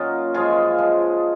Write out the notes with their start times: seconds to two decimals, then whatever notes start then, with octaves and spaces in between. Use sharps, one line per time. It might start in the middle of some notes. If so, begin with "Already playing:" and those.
Already playing: A#2 F#3 C#4 D#4 F4
0.34 F#2 F3 G#3 F4 G#4
0.78 F3 G#3